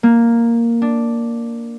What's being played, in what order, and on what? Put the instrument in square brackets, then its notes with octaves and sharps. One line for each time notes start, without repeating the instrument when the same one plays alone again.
[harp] A#3
D4